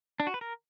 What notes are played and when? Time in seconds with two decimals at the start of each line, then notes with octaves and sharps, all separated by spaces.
0.20 D4
0.27 F#4
0.34 B4
0.41 A#4